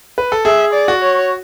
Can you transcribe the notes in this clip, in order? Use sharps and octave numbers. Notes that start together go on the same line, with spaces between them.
B4
A4
G#4 E5
D5
F#4
C#5